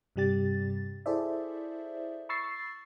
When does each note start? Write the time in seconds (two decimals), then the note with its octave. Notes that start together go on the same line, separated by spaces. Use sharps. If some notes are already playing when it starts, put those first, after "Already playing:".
0.16 G2 C3 G3 G4 A6
1.06 E4 G#4 A4 C5 D5 E5
2.29 B5 C#6 E6 A6 C7